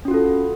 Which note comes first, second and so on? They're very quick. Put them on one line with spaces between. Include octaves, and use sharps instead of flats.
C#4 F#4 F4 A4